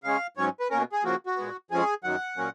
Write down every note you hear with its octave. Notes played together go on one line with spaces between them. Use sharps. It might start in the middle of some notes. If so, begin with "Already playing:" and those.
C#3 G#3 C#4 F5
G#2 F#3 C#4 C#5
B4
B2 A#3 C#4 A#4
G#4
C#3 F3 A#3 F#4
F#4
A#2 G#3 B3
F2 F3 G#3 C#4 G#4
F#2 D#3 F#3 F#5
A#2 F#3 A#3 C#4